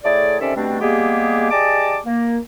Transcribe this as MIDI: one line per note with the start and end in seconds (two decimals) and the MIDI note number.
0.04 0.36 45
0.04 0.36 57
0.04 0.36 68
0.04 0.36 74
0.40 0.55 48
0.40 0.55 51
0.40 0.55 61
0.40 0.55 69
0.40 0.55 74
0.40 0.55 76
0.55 0.76 47
0.55 0.76 55
0.55 0.76 57
0.55 0.76 60
0.55 0.76 62
0.80 1.49 55
0.80 1.49 56
0.80 1.49 58
0.80 1.49 59
0.80 1.49 67
0.80 1.49 68
1.50 1.97 67
1.50 1.97 68
1.50 1.97 74
1.50 1.97 75
1.50 1.97 81
1.50 1.97 86
2.04 2.38 58